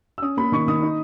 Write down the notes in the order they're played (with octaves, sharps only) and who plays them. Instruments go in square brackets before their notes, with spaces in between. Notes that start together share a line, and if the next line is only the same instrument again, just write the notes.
[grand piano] E6
C#4 D#6
A#3 B5
D#3 C#6
D#3 D#6
D#4